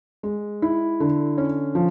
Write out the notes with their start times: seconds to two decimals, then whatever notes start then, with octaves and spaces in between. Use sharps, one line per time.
0.23 G#3
0.62 E4
1.00 D3
1.38 C#4
1.75 F3